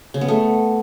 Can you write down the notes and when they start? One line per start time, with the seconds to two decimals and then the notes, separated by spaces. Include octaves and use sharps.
0.14 C#3
0.21 B3
0.28 A3